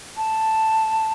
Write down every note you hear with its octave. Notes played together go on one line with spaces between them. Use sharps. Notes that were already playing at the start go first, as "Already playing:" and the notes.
A5